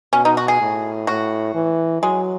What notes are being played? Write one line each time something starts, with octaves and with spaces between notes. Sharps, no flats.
B2 C#4
D#4
F#4
G#4
A2
A2 F#4
E3
F#3 G#3